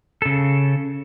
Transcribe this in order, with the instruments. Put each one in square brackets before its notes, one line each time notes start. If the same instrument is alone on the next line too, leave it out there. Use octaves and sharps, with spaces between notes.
[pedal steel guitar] C#3 A4